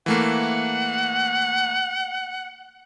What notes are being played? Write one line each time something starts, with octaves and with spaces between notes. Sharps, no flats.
E3 A3 A#3 F#5